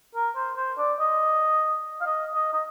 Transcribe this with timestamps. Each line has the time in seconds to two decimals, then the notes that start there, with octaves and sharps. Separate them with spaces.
0.15 A#4
0.36 C5
0.56 C5
0.78 D5
1.00 D#5
2.01 F5
2.06 D#5
2.34 D#5
2.53 D#5